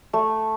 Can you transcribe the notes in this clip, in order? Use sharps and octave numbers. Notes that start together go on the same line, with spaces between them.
A3